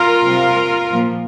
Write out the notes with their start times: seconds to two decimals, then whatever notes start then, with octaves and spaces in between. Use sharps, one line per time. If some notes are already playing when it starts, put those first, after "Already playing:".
Already playing: F4 A#4
0.24 C3 G3 C4
0.90 A#2 F3 A#3